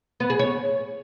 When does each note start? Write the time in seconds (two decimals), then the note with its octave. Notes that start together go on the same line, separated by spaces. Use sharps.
0.20 B3
0.30 G#4
0.39 C#5